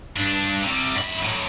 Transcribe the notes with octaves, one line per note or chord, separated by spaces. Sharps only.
G2 D4
C3 G3
F#2 B5
A2 F#3